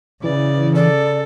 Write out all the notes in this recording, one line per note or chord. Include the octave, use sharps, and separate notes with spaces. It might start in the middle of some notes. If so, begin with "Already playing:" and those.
C#3 E3 D5
A4 D5